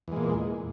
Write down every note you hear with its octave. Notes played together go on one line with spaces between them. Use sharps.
E2 A#2 G#3